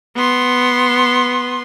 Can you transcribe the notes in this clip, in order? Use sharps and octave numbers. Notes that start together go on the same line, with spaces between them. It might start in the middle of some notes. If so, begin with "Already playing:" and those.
B3 C6